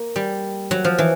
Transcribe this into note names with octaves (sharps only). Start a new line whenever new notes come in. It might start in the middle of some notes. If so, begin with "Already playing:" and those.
Already playing: A#3
G3
F#3
F3
E3